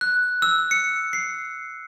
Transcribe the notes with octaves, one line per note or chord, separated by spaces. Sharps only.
F#6
E6
C#7
C7